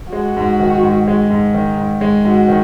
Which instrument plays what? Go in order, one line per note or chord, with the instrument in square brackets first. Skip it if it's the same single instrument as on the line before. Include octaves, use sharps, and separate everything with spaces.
[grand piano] G#3 [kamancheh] F#4
[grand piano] G#2
D#3
G#2
G#3
G#2
D#3
G#2
G#3
[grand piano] G#2 [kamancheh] F#4
[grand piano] D#3